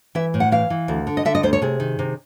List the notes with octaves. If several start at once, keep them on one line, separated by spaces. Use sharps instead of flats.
E3 E5
A2
F#5
E3 F5
E3
D2
D3
D#5
D3 E5
D#5
D2 C5
C#5
C3 G#4
D#3
C3